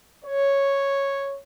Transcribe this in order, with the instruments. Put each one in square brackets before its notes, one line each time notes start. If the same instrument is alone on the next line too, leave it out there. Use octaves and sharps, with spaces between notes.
[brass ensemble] C#5